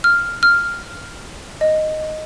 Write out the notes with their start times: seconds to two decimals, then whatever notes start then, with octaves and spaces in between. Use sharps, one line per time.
0.04 F6
0.43 F6
1.61 D#5